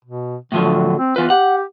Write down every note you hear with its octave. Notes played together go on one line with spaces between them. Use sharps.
B2
A2 D3 F3 F#3
C4
E2 F4 B4
G4 F#5